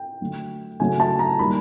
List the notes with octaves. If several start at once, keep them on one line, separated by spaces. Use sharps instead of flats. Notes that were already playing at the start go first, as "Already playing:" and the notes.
Already playing: G5
D3 F#3 A3
C#3 F#3 A3 G#5
A5
A#5
D#3 G3 A#3 B5